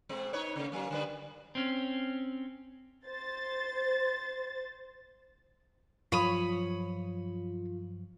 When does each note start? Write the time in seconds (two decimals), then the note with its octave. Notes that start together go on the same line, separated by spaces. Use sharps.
0.09 B2 G#3 C4
0.33 D#4 B4 C#5
0.56 C#3 A#3
0.72 F#3 A#3
0.90 D3 G3 B4
1.55 C4 C#4
3.06 C5 A6
6.12 G2 F3 F#3 F4 C#5 B5 D#6